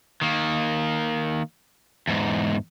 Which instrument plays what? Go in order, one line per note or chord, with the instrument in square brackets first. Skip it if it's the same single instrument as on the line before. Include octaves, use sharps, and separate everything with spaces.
[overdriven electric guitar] D#3 A#3
E2 G#2